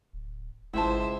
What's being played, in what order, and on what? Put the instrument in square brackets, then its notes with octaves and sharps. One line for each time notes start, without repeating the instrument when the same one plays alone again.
[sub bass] D1
[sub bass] G#1 [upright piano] C#2 C6 [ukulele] E4 A5 [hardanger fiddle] C5 E5